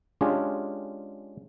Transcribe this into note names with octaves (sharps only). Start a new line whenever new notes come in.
G#3 C#4 D4 F4 G4 G#4